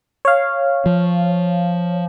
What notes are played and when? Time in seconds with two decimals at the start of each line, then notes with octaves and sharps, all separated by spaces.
0.25 C#5 F5
0.86 F3